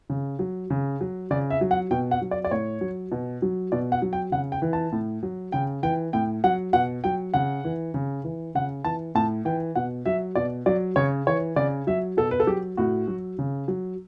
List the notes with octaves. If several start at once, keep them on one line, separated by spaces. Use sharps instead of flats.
C#3
F#3
C#3
F#3
C#3 D5
E5
F#3
F#5
B2 G5
F#5
F#3
D5
D5
A2 C#5
F#3
B2
F#3
B2 D5
F#5
F#3
G5
C#3 F#5
G5
E3
A5
A2
F#3
C#3 G5
E3 G5
A2 G5
F#3 F#5
B2 F#5
F#3 G5
C#3 F#5
E3
C#3
E3
C#3 F#5
E3 A5
A2 A5
E3 G5
B2 F#5
F#3 E5
B2 D5
F#3 D5
C#3 C#5
E3 C#5
C#3 D5
F#3 E5
B2 A4
B4
A4
F#3 G4
A2 F#4
F#3
C#3
F#3